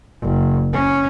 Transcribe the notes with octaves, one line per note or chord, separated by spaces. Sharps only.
F#1
C#4